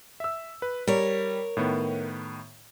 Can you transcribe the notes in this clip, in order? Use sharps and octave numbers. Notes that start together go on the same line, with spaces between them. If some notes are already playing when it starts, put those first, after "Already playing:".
E5 E6
B4
G3 A#4 C#5
A2 D#3 B3